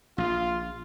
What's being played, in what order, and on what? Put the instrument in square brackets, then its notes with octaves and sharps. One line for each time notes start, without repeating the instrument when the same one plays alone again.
[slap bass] A#1 [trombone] F4